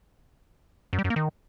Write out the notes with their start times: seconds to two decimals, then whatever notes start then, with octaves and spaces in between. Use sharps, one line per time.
0.93 F#2
0.99 G3
1.04 F#2
1.10 A#3
1.16 D#3